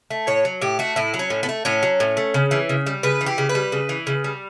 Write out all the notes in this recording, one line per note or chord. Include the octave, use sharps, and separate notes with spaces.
A3
A2 C#5
F#3
A2 G4
A3 F#4
A2 E4
F#3
C#4
A2
B3
A3
A2 C#4
F#3
A2
A3
C#3
E3
C#3
G3
C#3 B4
E3
G4
C#3
B4
G3
C#3
E3
C#3
G3